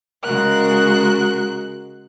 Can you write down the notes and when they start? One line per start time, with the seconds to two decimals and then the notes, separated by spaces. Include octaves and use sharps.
0.23 C#3 G#3 F#4 A#4 F#6